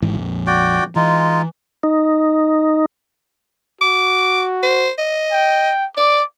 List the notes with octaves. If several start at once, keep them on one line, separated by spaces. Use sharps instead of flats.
G#1 G#2 E3
A#1 F2
F#4 D5 G5
E3 G#3 D#4 F4
D#4
F#4 D6
C5
D#5
G5
D5 D6